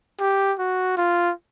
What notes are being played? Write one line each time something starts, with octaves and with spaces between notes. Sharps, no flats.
G4
F#4
F4